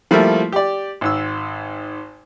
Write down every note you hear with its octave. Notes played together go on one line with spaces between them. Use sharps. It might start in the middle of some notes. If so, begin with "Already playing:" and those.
F3 G3 A3 A#3 E4
G4 D5
G#1 G#2 E6